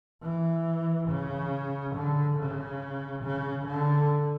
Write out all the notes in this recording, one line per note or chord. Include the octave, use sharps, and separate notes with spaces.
E3
C#3
D3
C#3
C#3
D3